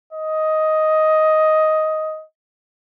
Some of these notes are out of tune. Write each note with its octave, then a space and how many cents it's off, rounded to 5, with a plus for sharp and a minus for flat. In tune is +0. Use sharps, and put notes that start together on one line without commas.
D#5 +10